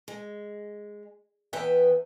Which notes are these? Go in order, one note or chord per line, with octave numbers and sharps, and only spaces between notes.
G#3
E2 E3 B3 B4 E5 G5